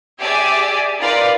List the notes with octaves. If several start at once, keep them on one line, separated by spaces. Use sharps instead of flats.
G4 G#4 D5 E5 G#5
D#4 F4 A#4 B4 D5